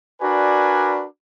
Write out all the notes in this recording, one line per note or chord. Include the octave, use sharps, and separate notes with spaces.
D4 F#4 A#4 B4 D5 G#5